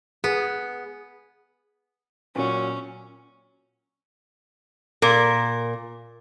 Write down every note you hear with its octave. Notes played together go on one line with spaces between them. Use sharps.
B3 G#4
A#2 F#3 C#4
A#2 A#4